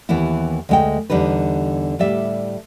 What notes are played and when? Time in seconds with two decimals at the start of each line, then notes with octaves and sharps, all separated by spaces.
0.09 D#2 E3 B3 E4
0.69 D2 G#3 G5
1.10 E2 D3 G3 D#4 B4
1.99 A2 G3 D5 E5